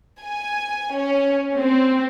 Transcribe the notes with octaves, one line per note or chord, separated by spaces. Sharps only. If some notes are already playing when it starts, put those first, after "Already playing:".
G#5
C#4
C4